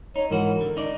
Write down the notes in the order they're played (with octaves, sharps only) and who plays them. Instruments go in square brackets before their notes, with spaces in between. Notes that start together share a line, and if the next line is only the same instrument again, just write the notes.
[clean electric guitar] D#4 [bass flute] C#5
[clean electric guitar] G#2 E3 F#4 [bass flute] A#4
[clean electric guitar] D3
D#4 D5